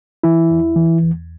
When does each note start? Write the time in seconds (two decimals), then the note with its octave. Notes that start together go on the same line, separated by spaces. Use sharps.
0.23 E3 E4
0.50 E2
0.76 E3
1.03 E2